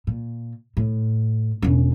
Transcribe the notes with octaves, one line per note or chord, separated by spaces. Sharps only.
A#2
A2
E1 C#4